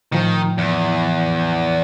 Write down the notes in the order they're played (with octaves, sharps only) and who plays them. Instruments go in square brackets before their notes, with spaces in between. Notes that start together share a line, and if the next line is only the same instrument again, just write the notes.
[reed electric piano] A2 F3 [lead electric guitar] D#3
[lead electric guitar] E2